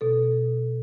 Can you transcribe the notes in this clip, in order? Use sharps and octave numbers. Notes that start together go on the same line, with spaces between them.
B2 A4